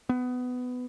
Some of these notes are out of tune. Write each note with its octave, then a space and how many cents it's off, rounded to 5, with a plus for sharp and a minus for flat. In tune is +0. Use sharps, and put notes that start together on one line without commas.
B3 +15